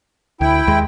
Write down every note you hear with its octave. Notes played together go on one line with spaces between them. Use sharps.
D2 E4 G5
D#2 G#3